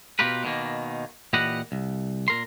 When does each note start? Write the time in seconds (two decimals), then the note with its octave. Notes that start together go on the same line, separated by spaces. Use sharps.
0.19 B2 F4 G4 A#4 B4
0.44 B2 D#3 A#3
1.33 A#2 E3 G4 B4 D#5 F#5
1.72 C2
2.28 A#2 A#4 C6